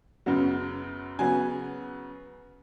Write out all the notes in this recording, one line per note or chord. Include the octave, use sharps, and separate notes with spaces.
F#2 C#3 F#3 B3
C#3 F#3 B3 G#5